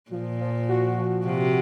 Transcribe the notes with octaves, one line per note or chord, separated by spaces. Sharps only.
A#2 F3
F3
F#4
F3
C3 F3